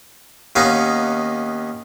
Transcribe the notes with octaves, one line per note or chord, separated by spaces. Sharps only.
D#2 B3 C#4 D#4 F5 A#5